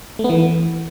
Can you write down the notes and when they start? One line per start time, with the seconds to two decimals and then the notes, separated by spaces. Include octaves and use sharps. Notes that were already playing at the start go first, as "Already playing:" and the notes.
0.19 A3
0.24 B3
0.29 E3